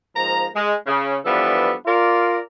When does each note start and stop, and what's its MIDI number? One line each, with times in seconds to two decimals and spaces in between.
0.16 0.47 44
0.16 0.47 53
0.16 0.47 58
0.16 0.47 82
0.55 0.74 56
0.86 1.16 49
1.26 1.73 52
1.26 1.73 53
1.26 1.73 55
1.26 1.73 59
1.26 1.73 62
1.26 1.73 69
1.86 2.39 65
1.86 2.39 70
1.86 2.39 74